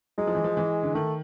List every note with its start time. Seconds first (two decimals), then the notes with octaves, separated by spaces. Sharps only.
0.18 F#3 G#3
0.27 F3
0.35 E3
0.44 F3
0.57 E3
0.83 D3
0.94 D#3 A3